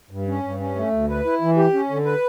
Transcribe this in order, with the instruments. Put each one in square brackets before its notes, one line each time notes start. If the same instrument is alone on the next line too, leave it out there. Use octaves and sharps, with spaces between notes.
[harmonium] G2
C#4
G2
C#4
A3
D2
B4
E4
E3
G4
C#4
D3
B4